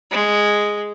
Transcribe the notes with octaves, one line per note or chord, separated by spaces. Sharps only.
G#3